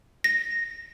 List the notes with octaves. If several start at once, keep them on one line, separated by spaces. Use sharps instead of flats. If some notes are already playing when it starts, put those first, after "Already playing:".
A#6